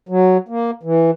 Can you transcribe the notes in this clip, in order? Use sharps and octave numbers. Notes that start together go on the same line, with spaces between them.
F#3
A#3
E3